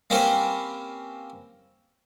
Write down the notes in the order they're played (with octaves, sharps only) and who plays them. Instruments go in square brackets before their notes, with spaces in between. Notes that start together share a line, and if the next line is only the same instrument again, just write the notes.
[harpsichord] A#3 C4 C#4 G4 B4 C5